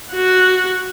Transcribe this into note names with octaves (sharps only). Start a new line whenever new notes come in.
F#4 F#5